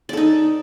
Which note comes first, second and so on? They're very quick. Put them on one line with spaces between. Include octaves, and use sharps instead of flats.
D5 A4 D#4